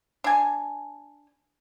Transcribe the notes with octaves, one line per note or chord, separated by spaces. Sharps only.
D4 G#5